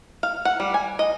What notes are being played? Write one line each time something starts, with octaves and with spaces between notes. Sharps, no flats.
F5
F#5
G3
G#5
D#5